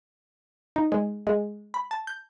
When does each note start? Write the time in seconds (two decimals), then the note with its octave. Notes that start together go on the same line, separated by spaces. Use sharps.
0.76 D#4
0.92 G#3
1.27 G#3
1.74 B5
1.91 A5
2.07 G6